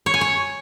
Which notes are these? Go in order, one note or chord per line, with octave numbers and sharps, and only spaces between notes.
C#5
G#5
C#5